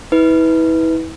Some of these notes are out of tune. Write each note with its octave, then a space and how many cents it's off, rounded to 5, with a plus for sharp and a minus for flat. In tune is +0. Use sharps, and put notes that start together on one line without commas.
E4 -35 B4 +0